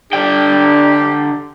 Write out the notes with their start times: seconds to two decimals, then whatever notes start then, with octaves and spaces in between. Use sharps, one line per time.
0.13 D3 D4 G4 G5